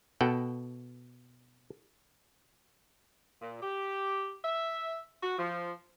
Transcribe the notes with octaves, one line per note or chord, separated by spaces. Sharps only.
B2 A4 F#5 G5
A#2
G4
E5
F#4
F3